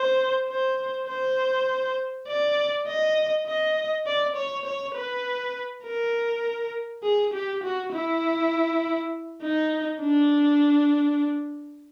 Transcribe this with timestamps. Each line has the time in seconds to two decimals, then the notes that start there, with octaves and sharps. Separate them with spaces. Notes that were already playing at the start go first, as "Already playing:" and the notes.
Already playing: C5
0.49 C5
1.08 C5
2.28 D5
2.87 D#5
3.46 D#5
4.06 D5
4.36 C#5
4.65 C#5
4.95 B4
5.84 A#4
7.03 G#4
7.33 G4
7.63 F#4
7.93 E4
9.42 D#4
10.00 D4